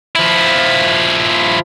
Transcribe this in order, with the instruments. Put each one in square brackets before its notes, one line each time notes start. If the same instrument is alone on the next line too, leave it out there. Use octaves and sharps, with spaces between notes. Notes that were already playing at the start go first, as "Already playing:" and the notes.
[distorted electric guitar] F3 E4